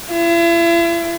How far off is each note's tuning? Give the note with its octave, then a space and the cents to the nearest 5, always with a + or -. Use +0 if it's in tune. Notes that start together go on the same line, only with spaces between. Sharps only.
E4 +40